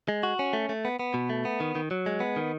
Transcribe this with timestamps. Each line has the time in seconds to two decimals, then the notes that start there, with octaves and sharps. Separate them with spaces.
0.08 G#3
0.23 F#4
0.39 C#4
0.53 A3
0.69 A3
0.85 B3
0.99 B3
1.14 B2
1.30 A3
1.45 B3
1.60 D#3
1.75 D#3
1.91 F#3
2.06 G#3
2.20 B3
2.36 D#3